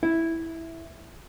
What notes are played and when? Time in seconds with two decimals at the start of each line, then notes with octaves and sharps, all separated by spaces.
0.03 E4